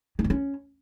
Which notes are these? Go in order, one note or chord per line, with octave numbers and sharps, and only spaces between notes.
C#4
C4
C#4